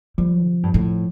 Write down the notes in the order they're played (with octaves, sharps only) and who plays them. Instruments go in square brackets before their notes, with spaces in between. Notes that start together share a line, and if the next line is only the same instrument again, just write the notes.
[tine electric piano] F3 [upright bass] G3
[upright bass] C3
G2
A2